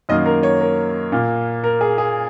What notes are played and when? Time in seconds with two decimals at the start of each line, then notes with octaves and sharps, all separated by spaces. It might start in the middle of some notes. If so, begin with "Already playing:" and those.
0.09 F#2 D#3 A#3 D#5
0.26 A#4
0.43 C#5
0.61 A#4
1.12 A#2 A#3
1.64 A#4
1.81 G#4
1.98 G#4